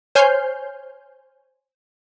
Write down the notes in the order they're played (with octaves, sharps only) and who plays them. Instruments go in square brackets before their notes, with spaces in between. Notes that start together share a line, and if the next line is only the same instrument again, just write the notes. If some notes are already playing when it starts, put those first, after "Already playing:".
[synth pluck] C5 C#5 G#5 F6 G6 C7